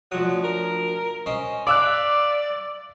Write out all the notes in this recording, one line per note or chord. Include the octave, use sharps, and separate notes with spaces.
D2 F3 F#3 D#6
A#4
C#4 C5 D#5
D5 E5 F5 B5 D6 E6 F#6